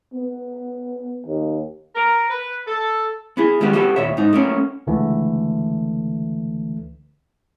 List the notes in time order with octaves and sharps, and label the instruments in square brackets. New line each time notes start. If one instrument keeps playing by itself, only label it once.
[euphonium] B3
D#2
[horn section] A#4
B4
A4
[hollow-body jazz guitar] B3 E4 G#4
D#3 G3 G#3 A#3 B3 F#4
F#4 G4 A4 B4
D#2 A#2 C#5 E5
G#2 D#4
A3 A#3 C#4
[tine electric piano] C#2 D3 E3 A3